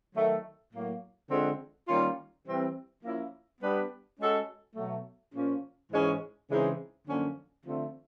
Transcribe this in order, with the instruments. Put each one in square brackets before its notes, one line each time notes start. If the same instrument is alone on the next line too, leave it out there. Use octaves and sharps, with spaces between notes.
[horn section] D#3 F#3 A3
A2 F#3 A#3
D3 F3 G#3 C4
D#3 G3 A#3 C#4 F4
E3 G3 C4
F3 A#3 C#4 E4
G3 B3 D4 G4 B4
G#3 C#4 F#4 A4
B2 F#3 A3
A#2 F3 A#3 C#4
G#2 E3 G#3 C#4
C#3 E3 G#3 C4 D#4
F#2 D3 F3 A#3 C#4
D3 F3 A3 C4